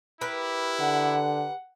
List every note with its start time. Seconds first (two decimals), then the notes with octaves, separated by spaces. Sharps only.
0.21 E4 G4 A#4 B4
0.80 D3 F#5